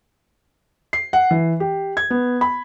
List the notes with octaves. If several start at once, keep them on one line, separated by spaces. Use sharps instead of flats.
C7
F#5
E3
G4
G#6
B3
B5